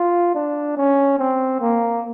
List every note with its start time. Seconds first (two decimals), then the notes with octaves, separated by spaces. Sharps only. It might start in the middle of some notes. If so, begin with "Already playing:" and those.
Already playing: F4
0.35 D4
0.77 C#4
1.19 C4
1.61 A#3